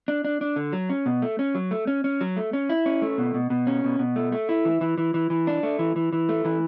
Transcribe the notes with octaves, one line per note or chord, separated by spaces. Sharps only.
D4
D4
D4
D3
F#3
C#4
B2
A3
C#4
F#3
A3
C#4
C#4
F#3
A3
C#4
E4
C#4
A3
B2
B2
B2
C#4
B2
B2
A3
A3
E4
E3
E3
E3
E3
E3
D4
A3
E3
E3
E3
A3
E3